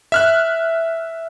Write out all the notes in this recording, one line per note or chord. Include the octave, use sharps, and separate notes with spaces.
E5 F6 F#6